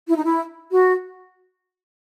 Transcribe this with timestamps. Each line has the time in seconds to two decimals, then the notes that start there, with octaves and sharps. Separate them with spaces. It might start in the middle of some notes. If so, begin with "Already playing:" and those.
0.08 E4
0.17 D#4
0.25 E4
0.72 F#4